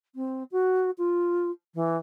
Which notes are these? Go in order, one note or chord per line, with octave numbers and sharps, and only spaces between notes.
C4
F#4
F4
E3